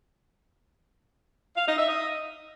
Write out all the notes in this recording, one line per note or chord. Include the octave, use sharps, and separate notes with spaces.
F5
D#4
E5
D#5